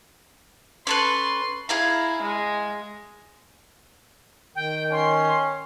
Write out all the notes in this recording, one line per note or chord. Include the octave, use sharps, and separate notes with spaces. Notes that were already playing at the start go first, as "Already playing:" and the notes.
C#4 A4 B4 C6
E4 G#4 F5 A#5
G#3
D#3 G5
C#4 C6